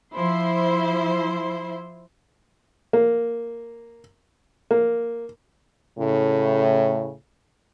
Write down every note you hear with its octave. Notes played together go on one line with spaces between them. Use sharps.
F3 E4 C5 C6
A#3
A#3
A2 C#3